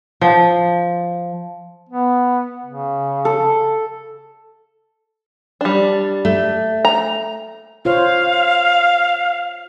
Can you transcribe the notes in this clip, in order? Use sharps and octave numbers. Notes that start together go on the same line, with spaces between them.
F3
B3
C#3
A4
G3 D4
A3
A#5
F4 C5 C#5 F5